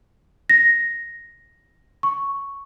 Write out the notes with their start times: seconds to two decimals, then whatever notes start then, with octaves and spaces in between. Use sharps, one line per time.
0.50 A#6
2.03 C#6